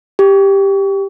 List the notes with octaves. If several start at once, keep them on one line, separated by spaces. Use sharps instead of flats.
G4